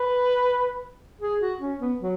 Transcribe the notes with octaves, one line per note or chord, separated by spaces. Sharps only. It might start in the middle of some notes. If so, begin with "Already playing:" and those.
Already playing: B4
G#4
F#4
C#4
B3
F#3